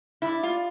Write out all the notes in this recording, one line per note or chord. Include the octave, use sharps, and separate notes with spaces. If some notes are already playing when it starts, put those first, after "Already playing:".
E4 D5
F4